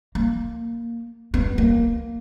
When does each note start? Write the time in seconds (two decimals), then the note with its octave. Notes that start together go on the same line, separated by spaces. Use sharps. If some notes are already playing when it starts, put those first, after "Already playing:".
0.15 A#3
1.34 B3
1.58 A#3